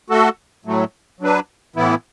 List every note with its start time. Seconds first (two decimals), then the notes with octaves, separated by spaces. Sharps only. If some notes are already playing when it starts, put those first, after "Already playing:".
0.10 A3 F#4 A4
0.65 A2 F#3 A3
1.20 F#3 D4 B4
1.76 A2 E3 B3 E4